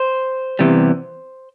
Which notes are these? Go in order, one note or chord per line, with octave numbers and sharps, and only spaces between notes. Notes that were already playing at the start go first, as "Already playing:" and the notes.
Already playing: C5
E2 C3 E3 G3